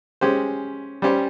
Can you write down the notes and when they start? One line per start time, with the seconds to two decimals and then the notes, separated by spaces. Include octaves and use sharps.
0.21 G#3 C#4 G4 C5
1.02 G3 C#4 G4 C5